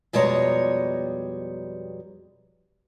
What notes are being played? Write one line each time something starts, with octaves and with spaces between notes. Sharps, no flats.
F2 B2 G3 G#3 C#5 A#5